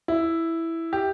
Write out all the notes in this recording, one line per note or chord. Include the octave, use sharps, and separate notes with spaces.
E4
G4